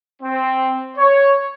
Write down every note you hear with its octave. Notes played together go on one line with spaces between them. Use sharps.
C4
C#5